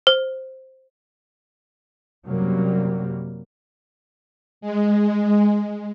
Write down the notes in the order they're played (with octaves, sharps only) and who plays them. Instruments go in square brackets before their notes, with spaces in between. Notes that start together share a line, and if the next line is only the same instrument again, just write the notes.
[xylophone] C5
[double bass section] F#2 C3 F#3 G3 A#3
[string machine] G#3